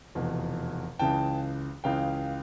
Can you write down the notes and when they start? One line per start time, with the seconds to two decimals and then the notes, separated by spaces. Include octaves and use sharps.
0.15 F1 E2 B2
0.99 C#2 C#3 E3 G5 A5
1.84 C#2 C#3 E3 F5 G5